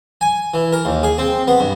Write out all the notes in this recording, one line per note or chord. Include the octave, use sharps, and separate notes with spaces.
G#5
E3
A#4
D#2
G#4
C4
B3
G2